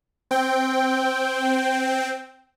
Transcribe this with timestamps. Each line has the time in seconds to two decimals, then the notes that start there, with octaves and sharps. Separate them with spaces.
0.31 C4 G5